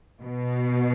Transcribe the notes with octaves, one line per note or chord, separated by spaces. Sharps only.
B2